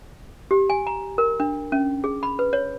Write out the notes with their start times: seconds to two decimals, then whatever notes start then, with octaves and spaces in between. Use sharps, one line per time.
0.51 G4
0.70 G#5
0.87 A#5
1.18 A#4
1.40 D4
1.72 C#4
2.04 G#4
2.23 B5
2.39 B4
2.53 C#5